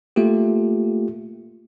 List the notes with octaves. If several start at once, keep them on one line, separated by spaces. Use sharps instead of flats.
A3 A#3 F4 G4